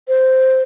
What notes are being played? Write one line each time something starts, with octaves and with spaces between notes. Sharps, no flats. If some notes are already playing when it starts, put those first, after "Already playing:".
C5